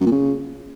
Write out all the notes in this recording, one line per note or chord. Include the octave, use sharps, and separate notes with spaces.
F#2
A#2
C#3